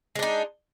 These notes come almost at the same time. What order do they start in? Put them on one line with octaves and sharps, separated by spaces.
G#3 D4 D#4